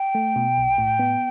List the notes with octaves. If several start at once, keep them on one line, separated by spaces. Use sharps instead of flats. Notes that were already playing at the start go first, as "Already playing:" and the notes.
Already playing: G5
A3
B2
B1
A2
B3